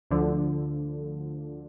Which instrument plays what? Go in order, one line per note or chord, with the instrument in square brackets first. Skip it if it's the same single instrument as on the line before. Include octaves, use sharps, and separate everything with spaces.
[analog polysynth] D2 D3 F3